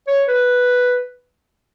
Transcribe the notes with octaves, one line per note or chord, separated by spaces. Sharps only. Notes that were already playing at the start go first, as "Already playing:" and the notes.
C#5
B4